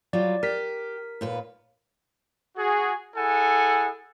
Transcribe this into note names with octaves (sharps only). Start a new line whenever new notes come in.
F#3 G3 F4 D5
G4 A#4 B6
D#2 A#2 B4
F#4 G#4
E4 G#4 A4 F#5 G#5